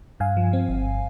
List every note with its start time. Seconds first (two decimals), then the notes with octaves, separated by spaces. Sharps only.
0.20 G2 F5 G#5
0.37 F3
0.53 C4
0.69 G1